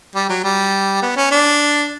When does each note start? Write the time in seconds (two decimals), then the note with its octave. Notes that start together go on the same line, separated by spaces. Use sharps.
0.15 G3
0.29 F#3
0.44 G3
1.02 B3
1.17 C#4
1.31 D4